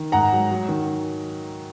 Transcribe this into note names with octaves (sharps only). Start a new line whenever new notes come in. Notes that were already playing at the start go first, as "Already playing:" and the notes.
Already playing: D#3
G#2 F#5 A#5
F#3
F#3
D#3